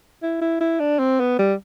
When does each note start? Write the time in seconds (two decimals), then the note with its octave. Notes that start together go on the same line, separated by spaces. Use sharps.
0.22 E4
0.42 E4
0.61 E4
0.80 D4
0.99 C4
1.20 B3
1.39 G3